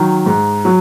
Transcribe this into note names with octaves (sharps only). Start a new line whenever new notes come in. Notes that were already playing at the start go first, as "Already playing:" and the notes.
Already playing: D#3 F#3
G#2
F#3